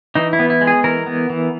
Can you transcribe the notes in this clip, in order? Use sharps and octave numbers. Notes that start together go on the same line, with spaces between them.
E3 D#4
E4
B3
E4
G#3
G#4
E3 A#4
B3
E3